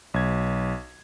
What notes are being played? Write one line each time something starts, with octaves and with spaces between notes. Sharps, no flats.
B1 G#6